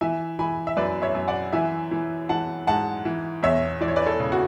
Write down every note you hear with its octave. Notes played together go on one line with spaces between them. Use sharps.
E3 E5 G#5
E3 G#5 B5
E5
F#2 B4 D5
C#5 E5
F#2
D5 F#5
E3 E5 G#5
E3
E3 F#5 A5
G#2 F#5 A5
E3
E2 C#5 E5
E3 D5
C#5
B4 D5
A4 C#5
C#3
F#4